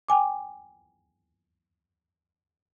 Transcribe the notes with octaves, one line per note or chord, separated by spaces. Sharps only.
G5 G#5 D6